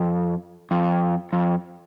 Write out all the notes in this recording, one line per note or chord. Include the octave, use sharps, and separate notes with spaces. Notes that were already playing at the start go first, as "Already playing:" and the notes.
Already playing: F2
F2
F2